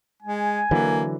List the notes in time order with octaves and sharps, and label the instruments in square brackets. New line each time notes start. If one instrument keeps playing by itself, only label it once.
[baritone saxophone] G#3 [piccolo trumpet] G#5
[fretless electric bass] D3 E3 F#3 [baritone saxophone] A#3